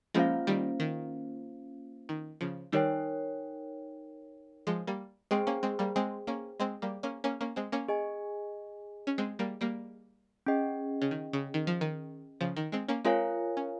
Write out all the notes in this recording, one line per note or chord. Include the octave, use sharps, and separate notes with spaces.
F3 G#3 A#3 C#4 F4 C5 F5
D#3 G3
D#3
D#3
C#3 F3
D#3 G3 D#4 A#4 C#5 G5
F3 G#3
G3 A#3
G#3 C4 G#4 C5 G5
A#3 C#4
G#3 C4
G3 A#3
G#3 C4
A#3 C#4
G#3 C4
G3 A#3
A#3 C#4
A#3 C#4
A#3 C#4
G#3 C4
A#3 C#4
G#4 D#5 G#5
C#4
G#3 C4
G3 A#3
G3 A#3
C#4 G#4 D#5 G5
C#3
D#3
C#3
D#3
F3
D#3
C#3 F3
D#3
G#3 C4
A#3 C#4
G#3 C4 F4 A#4 C#5 F5 G#5
C#4